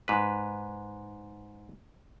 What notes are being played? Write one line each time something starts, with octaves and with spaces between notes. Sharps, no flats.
G#2 B4